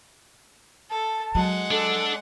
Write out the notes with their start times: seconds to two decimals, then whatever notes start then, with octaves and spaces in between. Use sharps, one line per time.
0.90 A4 A5
1.35 F#3 G#3 F#5
1.71 D4 A4